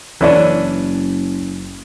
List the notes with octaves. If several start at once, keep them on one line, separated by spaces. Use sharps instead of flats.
F#1 E3 C#4 D4